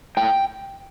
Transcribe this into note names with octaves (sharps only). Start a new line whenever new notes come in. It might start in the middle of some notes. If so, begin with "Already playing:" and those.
A2 G5